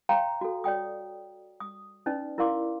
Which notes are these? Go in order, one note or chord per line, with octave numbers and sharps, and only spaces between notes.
C#5 F5 G5 A#5 C6
F#4 A4
C#5 D5 G5 D#6
D#6
C#4 D#4 B4 D5
E4 A#4 D5 F5 C6 D6